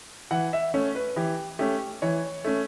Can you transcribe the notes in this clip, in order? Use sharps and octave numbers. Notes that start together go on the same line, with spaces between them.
E3 F#5
E5
A3 C#4 C#5
B4
E3 G4
A3 C#4 G4
E3 C#5
A3 C#4